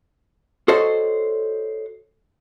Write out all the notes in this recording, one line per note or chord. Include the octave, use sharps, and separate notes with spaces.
F#4 A4 C5 C#5 D#5